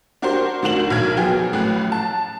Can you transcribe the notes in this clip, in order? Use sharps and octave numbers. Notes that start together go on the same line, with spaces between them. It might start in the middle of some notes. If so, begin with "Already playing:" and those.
D4 F#4 G4 A#4 C5
D2 D#3 D4 F#4 E7 F#7
B1 D#3 F6 G#6
F3 F#3 B3 G#4 G5 G#5
A1 A2 F#6
A5